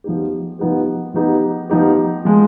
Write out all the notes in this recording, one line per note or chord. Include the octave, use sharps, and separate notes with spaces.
F3 B3 D#4 G4
F3 B3 D#4 G4
F3 B3 D#4 G4
F3 B3 D#4 G4
F3 G#3